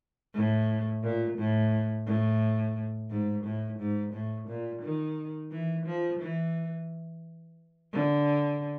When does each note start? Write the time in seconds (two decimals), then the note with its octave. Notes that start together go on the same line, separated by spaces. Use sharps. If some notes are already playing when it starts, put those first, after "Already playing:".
0.34 A2
1.03 A#2
1.37 A2
2.06 A2
3.10 G#2
3.44 A2
3.79 G#2
4.13 A2
4.48 A#2
4.82 D#3
5.51 E3
5.86 F3
6.20 E3
7.93 D3